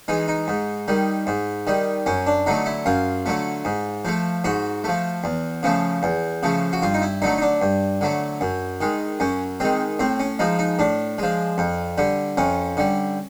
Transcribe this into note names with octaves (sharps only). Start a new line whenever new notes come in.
E3 G#3 D#4
D#4
G#2
D#3 G3
G#2
D#3 G3
F#2 C#4
D4
D3 F#3 A3 D#4
E4
F#2 F4
D3 F#3 A3
G#2
F3 A3
G#2 F#4
F3 A3
E2
C#3 F3 A3
E2
C#3 F3 A3
F#4
G2 F4
D#4
E4
D3 F#3 A3 D#4
D#4
D4
G2
D3 F#3 A3
F#2
D#3 G#3
F#2 C#4
D#3 G#3 C4
A2 C4
C#4
F3 G#3 D#4
D#4
A2 D4
F3 G#3
F2
D3 G3
F2 C#4
D3 G3